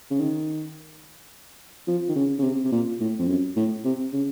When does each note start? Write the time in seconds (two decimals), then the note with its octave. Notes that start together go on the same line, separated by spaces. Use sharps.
0.11 C#3
0.19 D#3
1.88 F3
2.09 D#3
2.16 C#3
2.39 C#3
2.43 C3
2.64 C3
2.72 A#2
3.00 A2
3.19 F2
3.28 F#2
3.56 A2
3.85 C3
4.13 C#3